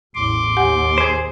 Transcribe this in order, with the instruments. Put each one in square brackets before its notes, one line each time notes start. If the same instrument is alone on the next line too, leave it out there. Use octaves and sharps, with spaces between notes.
[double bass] A1 E2 [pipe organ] C6 D6
[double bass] D#2 [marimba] G4 F#5 G#5
[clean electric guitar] G#4 C5